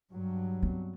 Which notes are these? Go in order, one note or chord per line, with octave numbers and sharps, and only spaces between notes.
G2 F#3
B3 C4